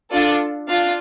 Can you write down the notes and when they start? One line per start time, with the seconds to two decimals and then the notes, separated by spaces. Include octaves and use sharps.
0.11 D4 F4 A4 D5
0.69 D4 F4 F5